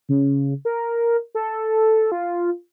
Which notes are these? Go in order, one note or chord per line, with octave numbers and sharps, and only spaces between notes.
C#3
A#4
A4
F4